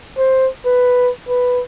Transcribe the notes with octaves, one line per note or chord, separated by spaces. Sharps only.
C5
B4
B4